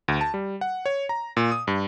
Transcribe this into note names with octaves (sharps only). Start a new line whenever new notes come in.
D2
A5
G3
F#5
C#5
A#5
A#2
D#6
G2